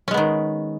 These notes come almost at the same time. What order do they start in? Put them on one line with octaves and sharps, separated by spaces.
C#4 G#3 B3 D#3